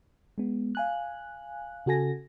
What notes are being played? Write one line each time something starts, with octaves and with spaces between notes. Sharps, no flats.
G#3 B3
F5 G#5 F#6
C#3 F#4 A4 G#5 A#6